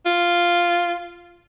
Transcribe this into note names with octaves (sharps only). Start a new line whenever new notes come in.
F4